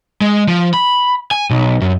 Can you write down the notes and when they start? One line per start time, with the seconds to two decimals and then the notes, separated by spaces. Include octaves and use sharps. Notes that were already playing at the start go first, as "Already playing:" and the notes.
0.21 G#3
0.48 F3
0.74 B5
1.31 G#5
1.50 B1
1.81 F#2